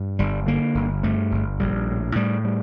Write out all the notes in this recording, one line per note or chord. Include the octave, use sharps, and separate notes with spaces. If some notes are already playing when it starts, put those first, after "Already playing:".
Already playing: G2
G1 G3
D3 A#3
G1
G2 A3
G1
A#1 G3
A2
A2 G3
G3